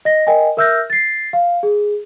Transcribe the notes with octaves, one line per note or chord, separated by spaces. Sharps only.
D#5 A#6
A#4 D#5 G5 G#5
A#4 E5 E6 F6 G6 A#6
A6 C7
F5
G#4